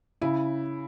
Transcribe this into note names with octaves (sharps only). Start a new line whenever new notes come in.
C#3 E4